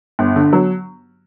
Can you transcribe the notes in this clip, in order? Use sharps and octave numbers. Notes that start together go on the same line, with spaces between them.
G1
D3
F#3